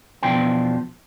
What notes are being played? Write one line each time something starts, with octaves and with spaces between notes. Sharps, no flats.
E2 B2 F3 D4 C5 G5